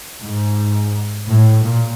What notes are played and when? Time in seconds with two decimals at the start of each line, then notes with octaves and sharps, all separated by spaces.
0.22 G#2
1.29 A2
1.65 A#2